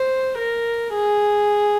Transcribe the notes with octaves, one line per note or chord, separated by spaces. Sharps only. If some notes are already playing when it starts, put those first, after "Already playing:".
Already playing: C5
A#4
G#4